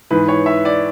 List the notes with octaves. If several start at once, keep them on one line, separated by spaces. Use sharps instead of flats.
G#2 E3 B4
C#5
E5
D5